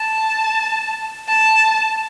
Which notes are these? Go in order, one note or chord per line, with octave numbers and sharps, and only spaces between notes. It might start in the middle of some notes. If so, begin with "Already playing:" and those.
Already playing: A5
A5